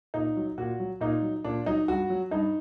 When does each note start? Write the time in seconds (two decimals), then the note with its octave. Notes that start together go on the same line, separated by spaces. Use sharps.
0.14 A#2 D#4
0.37 F#3
0.58 A#2 F#4
0.80 F#3
1.01 A#2 D#4
1.22 F#3
1.44 A#2 D4
1.66 F#3 D#4
1.88 G2 F#4
2.10 F#3
2.31 G2 D#4